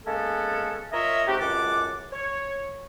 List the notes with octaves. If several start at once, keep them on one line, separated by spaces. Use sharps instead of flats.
G#3 A#3 B3 C#4 A4
F4 A#4 C#5 D#5 E5
G#2 C4 F#4 G4
C#2 F#2 F#5 A5 D6
C#5